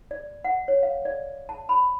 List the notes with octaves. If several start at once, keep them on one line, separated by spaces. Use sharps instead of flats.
D5
F#5
C#5
F5
D5
A5
B5